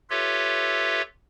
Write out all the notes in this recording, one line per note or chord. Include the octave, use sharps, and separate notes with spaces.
F4 G4 A4 B4 C#5 E5